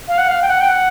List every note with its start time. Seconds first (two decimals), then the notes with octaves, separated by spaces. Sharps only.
0.08 F5
0.18 F#5
0.28 F5
0.42 G5
0.48 F#5
0.61 G5
0.68 F#5